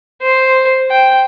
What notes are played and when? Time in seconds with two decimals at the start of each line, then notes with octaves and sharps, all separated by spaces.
0.22 C5
0.91 G5